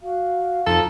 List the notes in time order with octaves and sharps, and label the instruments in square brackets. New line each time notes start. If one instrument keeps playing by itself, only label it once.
[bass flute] F#4 [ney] F5
[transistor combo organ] F2 [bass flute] D#4 [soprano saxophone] A4